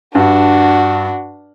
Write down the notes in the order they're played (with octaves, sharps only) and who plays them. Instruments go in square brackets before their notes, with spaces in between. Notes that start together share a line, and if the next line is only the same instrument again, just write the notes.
[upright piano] G2 [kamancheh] D4 F#4